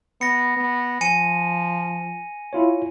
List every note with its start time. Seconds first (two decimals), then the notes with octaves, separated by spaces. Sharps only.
0.21 B3 A#6 C#7
0.57 B3
1.01 F3 G#5 C#7 D#7
2.53 E4 F4 C#5